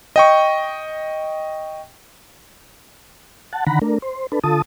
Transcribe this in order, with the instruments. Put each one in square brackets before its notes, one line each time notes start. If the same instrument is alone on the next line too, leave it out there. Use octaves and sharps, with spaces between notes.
[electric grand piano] D#5 G5 C#6
[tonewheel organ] F#5 A5
D3 D#3 F#5 A#5 B5
A3 D4 A#4
C5
D4 A4 B4
D3 F4 A4 A5 D#6